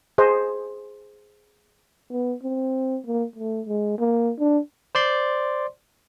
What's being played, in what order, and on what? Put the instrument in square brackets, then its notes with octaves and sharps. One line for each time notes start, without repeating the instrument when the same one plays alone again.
[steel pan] G#4 C5 D#5
[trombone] B3
C4
A#3
A3
G#3
A#3
D4
[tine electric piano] C5 D5 C6